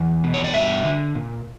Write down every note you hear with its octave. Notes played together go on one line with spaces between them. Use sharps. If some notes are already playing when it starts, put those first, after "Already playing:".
Already playing: E2
B2
C#5
D5
G2 E5
D3
A#2